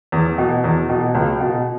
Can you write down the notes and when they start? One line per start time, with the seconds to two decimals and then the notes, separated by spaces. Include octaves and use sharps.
0.12 E2
0.38 B2
0.64 E2
0.89 B2
1.15 C#2
1.40 B2